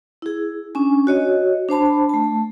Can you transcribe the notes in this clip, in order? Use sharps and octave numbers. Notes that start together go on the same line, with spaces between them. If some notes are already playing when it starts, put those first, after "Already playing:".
E4 G#4
C#4 D4 G#5
F#4 C#5 D#5
D4 C5 A5 B5
A3 A5